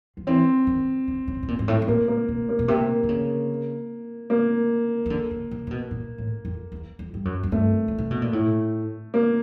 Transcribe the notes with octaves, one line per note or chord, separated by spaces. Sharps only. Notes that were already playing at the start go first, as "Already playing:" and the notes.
F3
E3 C4
D#3
D3
C#3
B2
A#2
G#2
A2
A2
A#2 A#3
A#3
B2
A#3
B2
C3 A#3
D3
C#3
A#3
D#3
D3
C#3
C3
C3
B2
A#2
A2
F2
E2
F2
G2
F#2
F#2
G2 A3
C#3
C3
B2
A#2
A2
A#3